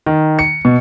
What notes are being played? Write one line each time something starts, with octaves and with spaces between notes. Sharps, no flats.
D#3
C#7
B2